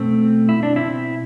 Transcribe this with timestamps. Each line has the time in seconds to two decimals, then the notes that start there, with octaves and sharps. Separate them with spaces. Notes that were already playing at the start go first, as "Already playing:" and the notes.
Already playing: B2 A3 C4
0.49 E4
0.63 D4
0.76 C4 E4